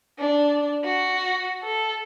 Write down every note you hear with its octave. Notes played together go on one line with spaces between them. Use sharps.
D4
F#4
A4